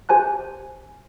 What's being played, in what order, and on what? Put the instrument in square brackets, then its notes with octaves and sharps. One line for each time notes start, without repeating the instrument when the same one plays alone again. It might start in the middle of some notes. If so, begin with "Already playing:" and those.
[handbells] G4 C5 G#5 A5 F#6